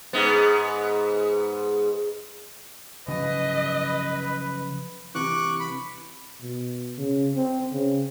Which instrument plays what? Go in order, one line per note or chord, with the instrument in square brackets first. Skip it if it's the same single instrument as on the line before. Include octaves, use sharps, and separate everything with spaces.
[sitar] G#2 B3
[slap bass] C#3 F3 F#3 [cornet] B4 [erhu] D#5
[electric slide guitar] C3 E3 [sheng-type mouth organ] C#6 D6 F#6
[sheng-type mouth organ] B5
[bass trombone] B2
C#3
C4
C#3